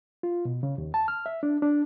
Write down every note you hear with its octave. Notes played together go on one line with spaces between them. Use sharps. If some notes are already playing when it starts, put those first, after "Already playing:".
F4
B2
C#3
D#2
A5
F6
E5
D4
D4